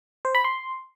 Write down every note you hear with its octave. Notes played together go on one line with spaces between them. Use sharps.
C5
B5
C6